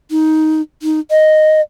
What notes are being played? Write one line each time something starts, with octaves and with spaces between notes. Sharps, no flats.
D#4
D#4
D#5